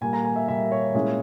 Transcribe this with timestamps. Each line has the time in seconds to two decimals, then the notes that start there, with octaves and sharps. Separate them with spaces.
0.01 A#2 G3 A#3 G#5
0.13 A#5
0.25 G#5
0.36 E5
0.48 A#2 G3 A#3 E5
0.72 C#5
0.94 A#2 G#3 C#4 E4